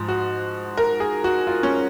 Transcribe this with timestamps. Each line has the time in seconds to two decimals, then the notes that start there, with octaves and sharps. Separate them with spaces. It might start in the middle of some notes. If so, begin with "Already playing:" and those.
Already playing: G#2 F3
0.08 F#4
0.77 A#4
1.00 G#4
1.24 F#4
1.47 F4
1.63 C#4